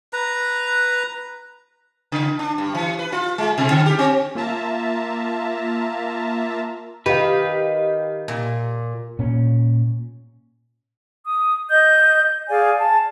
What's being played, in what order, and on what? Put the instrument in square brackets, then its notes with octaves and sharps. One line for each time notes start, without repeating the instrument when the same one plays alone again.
[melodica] B4 A#5
[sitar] C#3
D4
G2
E3
B4
F4
G#3
B2
D3
G4
C4
[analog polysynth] A#3 F4 E5 A5 A#5
[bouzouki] D#3 [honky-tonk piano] G4 F5 [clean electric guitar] B4
[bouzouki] A#2
[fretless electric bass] A#2 C#4
[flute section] D#6
D#5 G6
G#4 D5 F5 G#5
A5